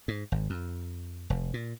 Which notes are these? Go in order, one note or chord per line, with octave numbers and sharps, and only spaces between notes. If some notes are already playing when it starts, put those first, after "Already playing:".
G#2
G#1
F2
F1
A#2